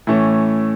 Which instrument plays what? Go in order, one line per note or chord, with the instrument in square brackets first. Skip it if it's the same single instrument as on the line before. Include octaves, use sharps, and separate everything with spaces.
[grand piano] A2 E3 A3 C#4